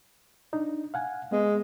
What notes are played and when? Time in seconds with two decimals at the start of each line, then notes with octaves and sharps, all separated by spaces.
0.53 D4 D#4
0.94 F5 F#5 G#5
1.32 G#3 B3